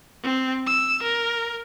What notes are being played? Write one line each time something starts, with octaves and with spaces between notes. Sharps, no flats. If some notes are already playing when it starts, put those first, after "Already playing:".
C4
E6
A#4